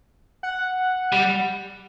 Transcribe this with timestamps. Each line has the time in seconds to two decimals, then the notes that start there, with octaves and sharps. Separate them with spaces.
0.43 F#5
1.12 G3